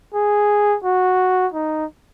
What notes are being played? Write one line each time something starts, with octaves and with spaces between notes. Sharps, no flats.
G#4
F#4
D#4